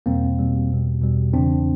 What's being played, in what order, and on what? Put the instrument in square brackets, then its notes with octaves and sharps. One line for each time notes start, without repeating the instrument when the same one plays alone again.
[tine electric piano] E2 B2 G3 A#3 C4
E2 B2 G3
E2 B2 G3
E2 B2 G3
E2 C#3 E3 C4 D4